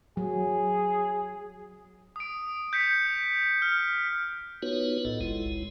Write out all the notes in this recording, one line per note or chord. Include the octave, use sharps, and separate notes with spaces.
F#3 G#4
D#6 D7
G6 B6 C#7
F6
B3 D#4 F4 F#4 B4 C#5
B1 A2 F4 A4 D#5
F#1 C2 G#3 E4